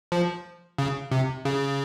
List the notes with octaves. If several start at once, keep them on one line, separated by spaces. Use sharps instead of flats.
F3
C#3
C3
C#3